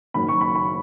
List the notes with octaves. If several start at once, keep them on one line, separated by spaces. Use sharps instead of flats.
F#1 F#2 D#3 B5
C#6
B5
B5